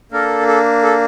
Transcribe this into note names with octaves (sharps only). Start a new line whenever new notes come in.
A#3 D4 A4 A#4
A4
A4